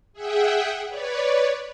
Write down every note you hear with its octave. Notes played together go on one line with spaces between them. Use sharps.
G#4 E5 F#5 G5
B4 C#5 D5